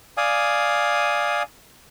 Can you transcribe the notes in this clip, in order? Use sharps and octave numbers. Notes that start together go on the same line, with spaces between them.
D5 F5 G#5 D#6